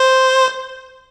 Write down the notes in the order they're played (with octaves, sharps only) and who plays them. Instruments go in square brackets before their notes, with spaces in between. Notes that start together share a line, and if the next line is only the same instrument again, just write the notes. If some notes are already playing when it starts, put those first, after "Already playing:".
Already playing: [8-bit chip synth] C5